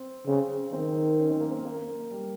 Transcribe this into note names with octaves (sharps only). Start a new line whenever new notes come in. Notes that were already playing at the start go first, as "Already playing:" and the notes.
Already playing: C4
C#3 C4
D#3 C4
C#4
C4
A#3
C4
A#3
G3